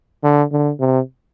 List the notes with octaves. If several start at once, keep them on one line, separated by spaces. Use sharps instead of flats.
D3
D3
C3